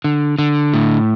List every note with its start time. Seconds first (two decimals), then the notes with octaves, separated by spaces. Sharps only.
0.04 D3
0.39 D3
0.74 A2